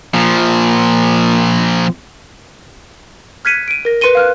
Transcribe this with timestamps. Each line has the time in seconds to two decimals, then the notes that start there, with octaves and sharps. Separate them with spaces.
0.14 A#2 F3
3.45 F6 F#6 G#6 B6 C#7 D#7
3.68 D7 D#7
3.85 A#4 A#6
4.01 B4 C6 C#7 D#7 G7
4.15 F5 F6 F#6